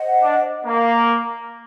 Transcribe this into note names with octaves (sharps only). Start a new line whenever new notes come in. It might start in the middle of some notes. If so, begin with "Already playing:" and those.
Already playing: C5 D#5 F#5
D4
A#3